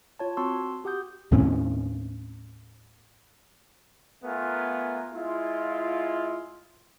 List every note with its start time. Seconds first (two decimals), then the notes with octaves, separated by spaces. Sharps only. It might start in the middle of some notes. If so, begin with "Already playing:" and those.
0.19 F4 C#5 A5
0.37 C4 F#4 A5 C6 C#6 E6
0.84 F#4 G4 F#5 D#6 G6
1.32 D#2 A2 C4 C#4
4.23 A3 B3 F4 A#4 G#5
5.13 G#3 E4 F4